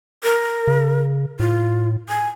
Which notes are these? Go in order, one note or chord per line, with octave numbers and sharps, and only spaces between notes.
A#4
C#3
A2 F4
G#5